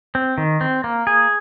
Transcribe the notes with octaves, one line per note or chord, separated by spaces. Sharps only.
C4
D#3
C4
A#3
G#4